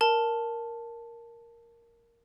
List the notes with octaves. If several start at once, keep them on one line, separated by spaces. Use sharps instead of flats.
A#4 A5